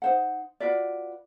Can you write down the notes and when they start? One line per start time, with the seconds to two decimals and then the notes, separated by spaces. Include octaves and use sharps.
0.02 D#4 C5 F#5
0.60 F4 F#4 B4 D5